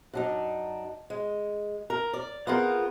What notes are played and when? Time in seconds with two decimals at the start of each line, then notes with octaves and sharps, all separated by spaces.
0.13 F#2 D4 D#4
1.10 G#3
1.90 A#4
2.13 D5
2.47 B3 C4 F4 G#4 A#4